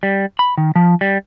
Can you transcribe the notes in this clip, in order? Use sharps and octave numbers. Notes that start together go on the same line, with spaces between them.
G3
B5
D#3
F3
G3